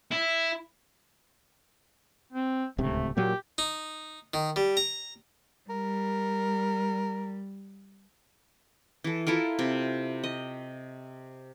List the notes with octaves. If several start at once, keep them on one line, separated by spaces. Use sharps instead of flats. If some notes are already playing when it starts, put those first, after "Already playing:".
E4
C4
D1 C#2 C3 A3
A#2 F#3 A#3 G4
D#4
D#3
G3
A#5
G3 A#4
E3 A4
E4 F4 A4 A#4
C3
D#5